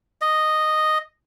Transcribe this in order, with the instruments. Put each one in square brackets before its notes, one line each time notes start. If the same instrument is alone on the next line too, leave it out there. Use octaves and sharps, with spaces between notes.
[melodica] D#5